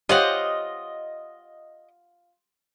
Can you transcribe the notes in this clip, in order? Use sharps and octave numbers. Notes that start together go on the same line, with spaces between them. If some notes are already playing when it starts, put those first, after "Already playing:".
F4 G4 C5 C#5 D#5 F5 F#5